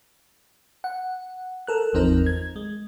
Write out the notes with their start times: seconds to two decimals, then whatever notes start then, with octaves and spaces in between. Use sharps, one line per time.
0.84 F#5
1.67 A4 A#4 F#6
1.93 G#1 E2 F3 C4 D#4 A#4
2.26 G#6
2.56 G#3